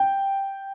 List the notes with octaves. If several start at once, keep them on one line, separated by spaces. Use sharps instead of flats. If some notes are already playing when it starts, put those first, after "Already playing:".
Already playing: G5